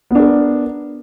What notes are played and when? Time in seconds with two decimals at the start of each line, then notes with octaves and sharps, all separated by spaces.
0.11 B3
0.15 D4
0.20 A#4